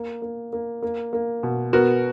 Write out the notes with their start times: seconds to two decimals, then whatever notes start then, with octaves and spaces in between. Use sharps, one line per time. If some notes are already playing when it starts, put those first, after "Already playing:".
Already playing: A#3
0.22 A#3
0.53 A#3
0.82 A#3
1.13 A#3
1.43 B2
1.73 B3 F#4 A#4